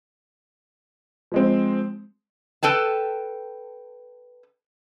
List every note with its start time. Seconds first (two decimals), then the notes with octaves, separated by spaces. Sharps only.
1.32 F3 G#3 C4
2.63 A4 B4 G5 A5